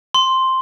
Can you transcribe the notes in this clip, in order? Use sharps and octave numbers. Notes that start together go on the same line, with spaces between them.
C6